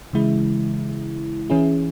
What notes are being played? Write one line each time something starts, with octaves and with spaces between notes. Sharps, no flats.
C#3 E3 G#3 E4
E3 C#4 E4 G#4